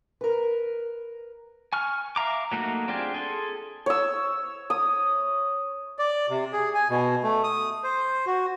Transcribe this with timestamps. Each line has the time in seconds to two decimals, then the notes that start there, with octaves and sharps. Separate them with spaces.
0.21 A#4 B4
1.73 G#5 C#6 F6
2.16 E5 F5 A#5 D6
2.52 F#3 A3 A#3 D#4 F#4
2.88 C4 D4 F4 G4 G#4
3.14 G#4 A4 C6
3.86 C#5 E6
4.70 D#6
5.99 D5
6.30 C3
6.53 G#4
6.75 G#5
6.90 B2
7.23 A3
7.44 D#6
7.84 C5
8.27 F#4